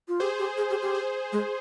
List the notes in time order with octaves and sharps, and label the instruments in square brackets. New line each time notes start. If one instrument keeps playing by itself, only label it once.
[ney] F4
[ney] G4 [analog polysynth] G#4 C5
[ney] G4
G#4
G4
G4
[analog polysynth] G#4 C5
[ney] G#3